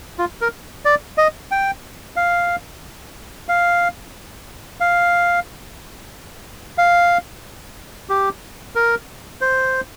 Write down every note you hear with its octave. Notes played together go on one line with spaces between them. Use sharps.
F4
A#4
D5
D#5
G5
F5
F5
F5
F5
G4
A#4
C5